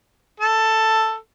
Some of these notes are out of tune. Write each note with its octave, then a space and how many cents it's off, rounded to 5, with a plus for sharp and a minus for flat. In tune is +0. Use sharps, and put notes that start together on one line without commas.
A4 +10